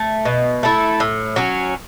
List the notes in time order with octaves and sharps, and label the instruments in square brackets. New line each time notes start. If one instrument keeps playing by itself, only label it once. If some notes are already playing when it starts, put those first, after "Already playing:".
Already playing: [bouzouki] A3
B2
A3 E4 A4
A2
F#3 C#4